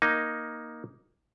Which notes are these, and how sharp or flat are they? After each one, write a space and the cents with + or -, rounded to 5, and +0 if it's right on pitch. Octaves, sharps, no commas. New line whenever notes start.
A#3 +10 D#4 +0